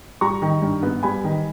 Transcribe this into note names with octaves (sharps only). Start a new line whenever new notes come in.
G3 A#5 C#6
D#3
G2
B3
G3 G#5 B5
D#3